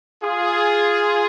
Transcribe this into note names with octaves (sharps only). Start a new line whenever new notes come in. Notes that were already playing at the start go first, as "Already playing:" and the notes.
F4 G#4